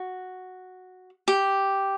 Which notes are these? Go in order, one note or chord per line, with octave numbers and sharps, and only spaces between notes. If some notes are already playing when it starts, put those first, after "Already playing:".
Already playing: F#4
G4